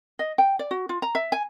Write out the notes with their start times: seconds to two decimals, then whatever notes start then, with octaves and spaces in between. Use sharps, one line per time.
0.19 D#5
0.38 G5
0.59 D5
0.71 F#4
0.89 F4
1.02 A#5
1.15 E5
1.32 G#5